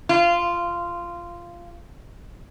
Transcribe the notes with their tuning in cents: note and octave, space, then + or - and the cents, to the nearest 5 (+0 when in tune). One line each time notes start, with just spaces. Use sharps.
F4 -10